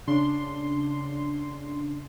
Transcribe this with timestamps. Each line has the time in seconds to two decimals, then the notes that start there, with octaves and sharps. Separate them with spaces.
0.07 C#3 D4 C6